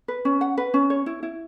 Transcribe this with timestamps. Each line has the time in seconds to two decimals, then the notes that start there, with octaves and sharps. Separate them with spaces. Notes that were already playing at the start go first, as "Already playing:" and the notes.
0.08 B4
0.25 C#4
0.41 F#5
0.57 B4
0.74 C#4
0.90 C#5
1.06 E4
1.23 E4